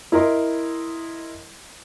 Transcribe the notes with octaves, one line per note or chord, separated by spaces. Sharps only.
E4 A#4 D#5 C6